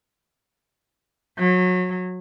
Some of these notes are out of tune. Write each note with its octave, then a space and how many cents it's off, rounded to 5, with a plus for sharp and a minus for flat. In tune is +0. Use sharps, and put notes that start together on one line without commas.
F#3 -25